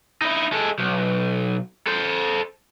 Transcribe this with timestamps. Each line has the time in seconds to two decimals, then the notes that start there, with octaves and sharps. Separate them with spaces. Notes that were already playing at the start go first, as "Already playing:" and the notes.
0.22 D#4 E4
0.52 G#3 A4
0.78 B1
1.87 A4 C5